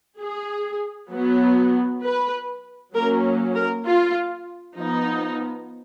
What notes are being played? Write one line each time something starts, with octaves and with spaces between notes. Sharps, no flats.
G#4
F#3 B3
B4
F#3 A#3 C#4 A#4
A#4
F4
F3 B3 D#4